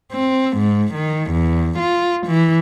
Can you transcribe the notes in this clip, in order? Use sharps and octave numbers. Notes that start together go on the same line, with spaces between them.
C4
G#2
D#3
E2
F4
E3